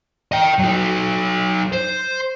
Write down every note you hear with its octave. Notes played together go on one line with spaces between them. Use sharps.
D#5 G5
F#3 D#4
C5